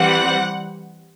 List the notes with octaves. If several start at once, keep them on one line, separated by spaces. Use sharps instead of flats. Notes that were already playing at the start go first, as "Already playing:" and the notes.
Already playing: E3 G3 C4 F#5